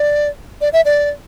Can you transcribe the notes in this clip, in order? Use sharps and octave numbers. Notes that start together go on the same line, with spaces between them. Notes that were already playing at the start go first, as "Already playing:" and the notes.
Already playing: D5
D5
E5
D5